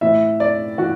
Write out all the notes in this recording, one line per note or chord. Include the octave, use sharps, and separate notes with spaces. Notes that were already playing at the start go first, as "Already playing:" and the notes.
A2 E3 E5
D5
E3 F#4